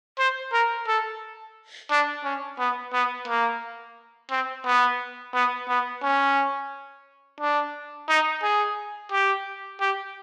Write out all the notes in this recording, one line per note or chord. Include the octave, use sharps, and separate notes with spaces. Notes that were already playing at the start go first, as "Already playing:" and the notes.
C5
A#4
A4
D4
C#4
B3
B3
A#3
C4
B3
B3
B3
C#4
D4
D#4
G#4
G4
G4